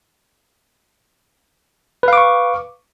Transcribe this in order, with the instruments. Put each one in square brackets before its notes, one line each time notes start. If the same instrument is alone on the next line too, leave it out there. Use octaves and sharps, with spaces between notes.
[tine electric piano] B4
F5
D6
C#6